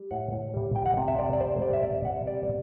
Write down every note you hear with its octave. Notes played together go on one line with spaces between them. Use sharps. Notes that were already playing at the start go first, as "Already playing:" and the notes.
Already playing: G3
A2 F#5
A2
G3
G3 G5
F#5
C3
E5
C3 D5
D5
G3 C5
G3 D5
E5
C3 D5
E5
C3 F#5
G3 D5